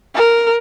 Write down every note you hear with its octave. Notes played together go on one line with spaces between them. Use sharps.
A#4